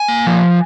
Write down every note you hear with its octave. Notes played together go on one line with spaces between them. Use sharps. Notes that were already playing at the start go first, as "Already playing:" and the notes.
Already playing: G#5
A#3
F3